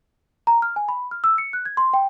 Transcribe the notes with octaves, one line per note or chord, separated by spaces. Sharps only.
A#5
F6
G#5
B5
F6
E6
C#7
F#6
G#6
C6
G5